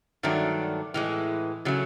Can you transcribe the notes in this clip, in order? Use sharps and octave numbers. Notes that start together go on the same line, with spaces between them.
G2 D#3 F#3 A3 D4
A2 E3 G#3
C#3 F#3 A3